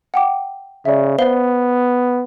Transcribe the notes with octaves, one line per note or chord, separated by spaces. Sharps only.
F#5 G5 D6
C#3 D5 E5
B3 C5 F5 G7